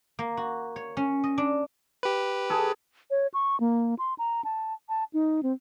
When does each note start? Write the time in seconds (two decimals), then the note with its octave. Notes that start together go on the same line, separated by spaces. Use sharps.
0.19 A#3
0.37 F#4
0.76 C#5
0.97 C#4
1.24 D#5
1.38 D4
2.03 G4 B4
2.50 G#4 A4
3.11 C#5
3.34 C#6
3.60 A#3
3.99 C6
4.19 A#5
4.45 A5
4.89 A5
5.14 D#4
5.43 C4